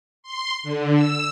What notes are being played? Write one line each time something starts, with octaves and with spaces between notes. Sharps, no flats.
C6
D3
E6